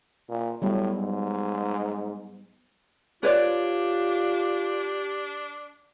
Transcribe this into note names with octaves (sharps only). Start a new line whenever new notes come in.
A#2
A2 F#3 G3 B3
G#2
D4 F4 G4 B4 C#5 D5